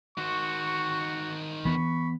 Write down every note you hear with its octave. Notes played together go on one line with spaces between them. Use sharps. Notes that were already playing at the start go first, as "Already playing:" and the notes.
D#3 F#4 C5 C#6
E3 B3 B5 C#6